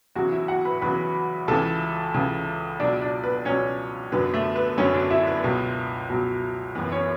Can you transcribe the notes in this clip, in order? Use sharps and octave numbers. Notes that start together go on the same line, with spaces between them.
E2 C#3 F#3 F#4
E4 E5
F#4 F#5
B4 B5
E2 C#3 F#3 B4 B5
C#2 C#3 E3 A4 A5
C#2 C#3 E3
C#2 B2 F#3 D4 D5
D4 D5
B3 B4
C#2 B2 F#3 C#4 C#5
F#2 D3 F#3 B3 B4
A3 A4
B3 B4
F#2 D3 F#3 C#4 C#5
D4 D5
E4 E5
B3 B4
C#2 B2 F#3
C#2 B2 F#3
F#2 E3 B3 B4
C#4 C#5